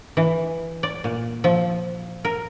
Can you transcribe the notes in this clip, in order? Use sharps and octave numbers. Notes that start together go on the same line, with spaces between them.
E3
D5
A#2
F3
A#4